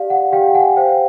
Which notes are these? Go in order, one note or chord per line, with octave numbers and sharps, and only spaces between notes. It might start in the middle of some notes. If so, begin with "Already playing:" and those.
Already playing: G4 D5 F5
F#5
G4 F5 G5
F#5 G#5
C5 F5 G5